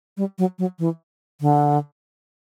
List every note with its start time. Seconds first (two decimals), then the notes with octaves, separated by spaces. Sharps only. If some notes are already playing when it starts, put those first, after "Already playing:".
0.17 G3
0.38 F#3
0.59 F#3
0.79 E3
1.41 D3